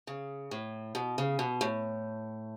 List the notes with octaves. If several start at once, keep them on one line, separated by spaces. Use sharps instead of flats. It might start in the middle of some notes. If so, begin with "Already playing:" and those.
C#3
A2
B2
C#3
B2
A2